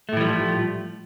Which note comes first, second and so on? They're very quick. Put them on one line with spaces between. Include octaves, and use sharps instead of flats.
A3 A2 E3 G3 F3